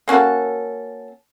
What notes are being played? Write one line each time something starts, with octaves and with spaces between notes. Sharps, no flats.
A#3 C#4 F#4 A4